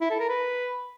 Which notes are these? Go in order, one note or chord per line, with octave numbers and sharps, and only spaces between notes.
E4
A4
A#4
B4